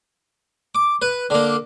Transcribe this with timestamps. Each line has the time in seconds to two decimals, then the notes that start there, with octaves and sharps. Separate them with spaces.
0.75 D6
1.02 B4
1.30 D3 A#3